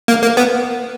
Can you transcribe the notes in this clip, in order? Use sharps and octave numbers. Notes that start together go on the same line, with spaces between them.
A#3
A#3
B3